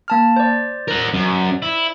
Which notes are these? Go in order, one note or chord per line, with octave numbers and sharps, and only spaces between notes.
A#3 A5 F6
C5 D5
A#4 F#5
F#2
E4